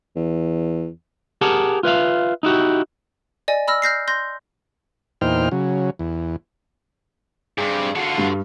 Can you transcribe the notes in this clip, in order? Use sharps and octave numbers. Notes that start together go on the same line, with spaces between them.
E2
G4 G#4 A#4 F#5 A5
F4 B4 E5 F5
D#4 E4 F#4 G4
D5 D#5 G#5
B5 E6 F6 A#6
F6 G6 A#6 C7
C6 G6 A#6
E2 A#2 D#4 C5 G5 F6
C#3 F#3
E2
G2 C4 G4 G#4
D3 F4 F#4
G2